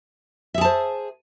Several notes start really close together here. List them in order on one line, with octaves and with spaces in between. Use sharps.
E5 G#4 A5 C5